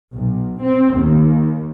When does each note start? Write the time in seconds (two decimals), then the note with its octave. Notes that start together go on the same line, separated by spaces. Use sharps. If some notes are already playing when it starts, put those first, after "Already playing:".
0.14 B1
0.62 C4
0.96 D#2